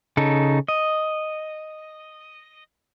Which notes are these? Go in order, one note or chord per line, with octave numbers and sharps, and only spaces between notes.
C#3 D#4 A4
D#5